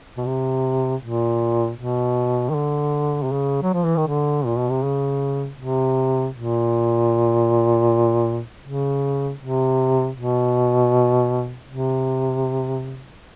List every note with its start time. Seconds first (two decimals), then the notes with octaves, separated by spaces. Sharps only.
0.17 B2
0.27 C3
1.03 A#2
1.78 B2
2.49 D#3
2.54 D3
3.23 C3
3.32 C#3
3.62 F#3
3.73 F3
3.84 E3
3.96 D#3
4.07 D3
4.46 A#2
4.58 B2
4.70 C3
4.83 C#3
5.59 C3
6.35 A#2
8.64 C#3
9.40 C3
10.16 B2
11.69 C3